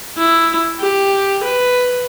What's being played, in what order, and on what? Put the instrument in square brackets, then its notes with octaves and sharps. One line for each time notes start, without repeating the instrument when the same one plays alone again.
[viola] E4
G4
B4